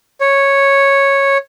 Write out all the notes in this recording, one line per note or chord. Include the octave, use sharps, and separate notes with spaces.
C#5